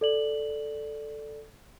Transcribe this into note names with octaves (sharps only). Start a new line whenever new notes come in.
A4 D5 F#7